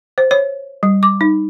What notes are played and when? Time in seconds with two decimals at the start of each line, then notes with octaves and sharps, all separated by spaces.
0.18 C5
0.31 C#5
0.83 G3
1.03 D6
1.21 D#4